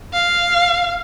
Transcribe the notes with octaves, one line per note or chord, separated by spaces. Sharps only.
F5